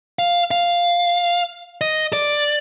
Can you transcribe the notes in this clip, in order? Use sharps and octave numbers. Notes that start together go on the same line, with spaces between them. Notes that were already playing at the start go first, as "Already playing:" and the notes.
F5
F5
D#5
D5